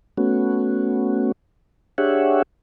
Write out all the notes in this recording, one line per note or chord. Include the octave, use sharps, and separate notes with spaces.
A3 B3 C#4 F#4
D4 G4 G#4 C#5 E5 F#5